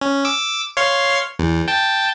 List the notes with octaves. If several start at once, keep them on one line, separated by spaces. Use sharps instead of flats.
C#4
D6 E6
C#5 F5 C6
E2
G5 A5